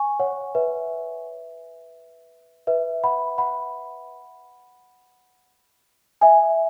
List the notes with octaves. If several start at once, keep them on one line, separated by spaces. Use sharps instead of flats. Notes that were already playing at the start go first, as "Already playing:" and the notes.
Already playing: G#5 C#6
C#5 F#5
B4 E5
B4 E5
F#5 B5
F#5 B5
E5 G#5